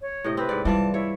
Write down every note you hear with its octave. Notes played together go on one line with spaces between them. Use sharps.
C#5
A2 C3 D#5
C4 B4
G#2 D5
E3 G3 F4 D5 A5
E4 C#5